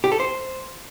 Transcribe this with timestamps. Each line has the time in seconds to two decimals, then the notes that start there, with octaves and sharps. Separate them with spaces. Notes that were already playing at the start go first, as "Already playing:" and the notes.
0.04 G4
0.12 A4
0.20 C5